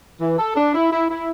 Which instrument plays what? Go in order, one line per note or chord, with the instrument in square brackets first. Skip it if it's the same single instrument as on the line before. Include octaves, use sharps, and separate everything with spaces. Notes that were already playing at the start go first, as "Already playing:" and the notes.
[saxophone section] E3
A4
D4
E4
E4
E4